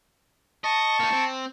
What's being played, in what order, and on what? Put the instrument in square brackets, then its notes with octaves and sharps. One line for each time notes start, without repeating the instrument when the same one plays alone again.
[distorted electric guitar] D#5 [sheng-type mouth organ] A5 C#6
[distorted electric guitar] A#3 D#4
C4